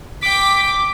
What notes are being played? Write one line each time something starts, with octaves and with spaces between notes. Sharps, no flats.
G5 D6 B6